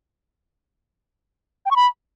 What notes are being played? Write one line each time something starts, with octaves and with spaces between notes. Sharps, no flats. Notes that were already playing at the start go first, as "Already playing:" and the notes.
G5
C#6
B5